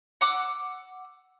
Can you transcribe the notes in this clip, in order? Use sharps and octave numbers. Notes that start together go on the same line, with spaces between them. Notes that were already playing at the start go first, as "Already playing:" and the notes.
F#5 D6 E6